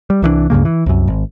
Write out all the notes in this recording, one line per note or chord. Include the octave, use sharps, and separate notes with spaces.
G3
C2 E3 F#3 D4
C#2 G2 C#3 A#3
E3
C2 F#2
G#1